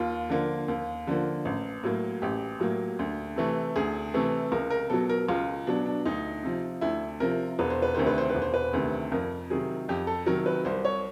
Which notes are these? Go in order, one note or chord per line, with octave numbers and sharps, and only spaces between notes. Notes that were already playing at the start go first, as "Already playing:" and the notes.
Already playing: D#2 F4
D3 F3 A#3
D#2
D3 F3 A#3
A1
A2 F#3 A#3
A1 G4
A2 F#3 A#3
D2
C3 E3 A3
D2 G#4
C3 E3 A3
C#2 A#4
A#4
B2 F#3 A4
A#4
C#2 F4
B2 F#3 D4
D4
D2 D#4
C3 F3
D2 E4
C3 F3 A#4
E1 B4
C5
B4
D2 C3 D#3 C5
B4
C5
B4
E1
C5
B4
D2 C3 D#3
F2 A#4
C3 D#3 F#3 G#4
F2 G4
A4
C3 D#3 F#3 A#4
B4
C2 C5
C#5